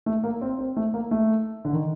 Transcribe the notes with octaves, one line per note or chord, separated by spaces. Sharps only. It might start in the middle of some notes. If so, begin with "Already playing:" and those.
A3
A#3
C4
C4
A3
A#3
A3
D3
D#3